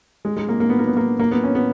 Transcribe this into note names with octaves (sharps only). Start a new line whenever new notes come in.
G#3
G#3
A#3
A#3
B3
A#3
B3
A#3
A#3
B3
C#4
B3